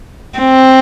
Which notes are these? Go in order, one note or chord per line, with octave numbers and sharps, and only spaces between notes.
C4